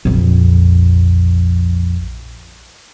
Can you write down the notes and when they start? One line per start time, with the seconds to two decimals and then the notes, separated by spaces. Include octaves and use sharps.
0.05 A#1 F2